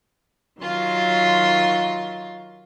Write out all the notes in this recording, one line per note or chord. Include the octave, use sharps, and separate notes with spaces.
D#3 F#3 F4 C6